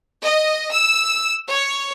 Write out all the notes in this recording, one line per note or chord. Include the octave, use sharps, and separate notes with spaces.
D#5
E6
C#5